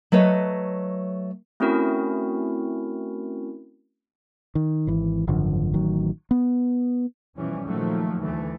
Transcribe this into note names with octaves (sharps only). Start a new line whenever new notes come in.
F#3 A3 B4 C#5 D#5
A3 C4 C#4 E4 F#4 A#4
D#3
G#1 E3
G#1 F#2 D3 F3
A1 D#3 F#3
B3
B2 E3 F3 G3 C#4
A#2 D#3 F3 F#3 A3
D2 E3 A3